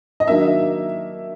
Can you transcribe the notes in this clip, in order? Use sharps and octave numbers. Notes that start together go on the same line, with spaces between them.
D#5
D#3 F#3 A#3 D4 E5